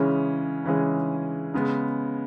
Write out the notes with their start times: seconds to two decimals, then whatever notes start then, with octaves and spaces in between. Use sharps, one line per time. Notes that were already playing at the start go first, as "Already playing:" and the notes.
Already playing: C#3 E3 G#3 C#4 G#4
0.64 C#3 E3 G#3 C#4 G#4
1.54 C#3 G#3 B3